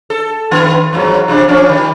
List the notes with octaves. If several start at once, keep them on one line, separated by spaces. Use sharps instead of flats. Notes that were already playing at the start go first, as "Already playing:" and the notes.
A4
G2 D#3 B3
E2 G#2 F#3
E2 C3 D4
F3 C#4 D4
D#3 G3